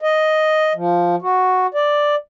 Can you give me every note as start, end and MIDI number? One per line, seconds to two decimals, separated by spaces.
0.02 0.73 75
0.75 1.16 53
1.22 1.67 66
1.74 2.15 74